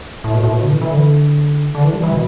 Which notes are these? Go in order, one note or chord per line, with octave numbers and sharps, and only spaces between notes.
A2
B2
A2
B2
D3
E3
E3
D3
D3
E3
G3
E3
B2